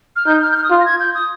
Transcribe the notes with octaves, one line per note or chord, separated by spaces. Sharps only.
F6
D#4 G6
F6
G6
F6
D#6
F4 F6
A#6
G#6
G6
D#6